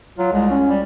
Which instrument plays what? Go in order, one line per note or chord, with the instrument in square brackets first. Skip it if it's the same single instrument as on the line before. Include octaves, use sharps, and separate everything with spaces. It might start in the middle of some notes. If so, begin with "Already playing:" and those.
[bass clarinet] F#3 [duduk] F4
[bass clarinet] C2 [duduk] G#3
[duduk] C#4
[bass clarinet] G3